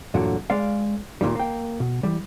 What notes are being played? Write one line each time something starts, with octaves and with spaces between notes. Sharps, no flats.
E2 G2 A#2 D3 F#3
G#3 D5 F5
D2 A#2 D3 D#3 G3
A#3 G5
B2
E3 G3